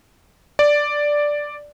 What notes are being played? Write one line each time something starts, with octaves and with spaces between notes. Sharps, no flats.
D5